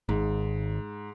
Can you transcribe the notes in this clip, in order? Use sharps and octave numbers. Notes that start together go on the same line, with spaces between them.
G#1 G#2